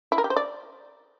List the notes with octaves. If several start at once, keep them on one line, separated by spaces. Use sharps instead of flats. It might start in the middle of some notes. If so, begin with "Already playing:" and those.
E4
A#4
G4
C5
D5